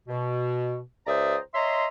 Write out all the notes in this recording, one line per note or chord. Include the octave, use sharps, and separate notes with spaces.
B2
C#2 C5 D5 E5 A#5 D#6
C#5 D#5 E5 A#5 C6